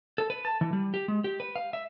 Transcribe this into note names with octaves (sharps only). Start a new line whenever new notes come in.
A4
B4
A5
E3
G3
G4
G#3
G4
B4
F5
E5